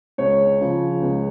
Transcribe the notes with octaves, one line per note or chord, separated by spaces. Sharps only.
C#2 C#5
C#3 F3
C#2